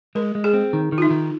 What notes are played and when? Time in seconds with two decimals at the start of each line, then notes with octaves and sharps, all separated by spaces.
0.15 G#3 A#4
0.35 G#3
0.44 G#4
0.54 C4
0.73 D#3
0.92 D#3
0.98 F4
1.02 D#4
1.10 D#3